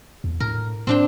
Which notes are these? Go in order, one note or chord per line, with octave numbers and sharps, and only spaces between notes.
E2
A2 A#4
A2 C4 D4 G5